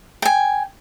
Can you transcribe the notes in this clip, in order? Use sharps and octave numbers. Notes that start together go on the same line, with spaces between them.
G5 G#5